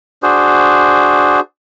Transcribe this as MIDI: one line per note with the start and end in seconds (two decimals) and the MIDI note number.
0.23 1.40 62
0.23 1.40 66
0.23 1.40 68
0.23 1.40 72